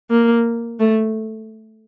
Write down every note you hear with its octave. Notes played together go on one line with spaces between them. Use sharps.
A#3
A3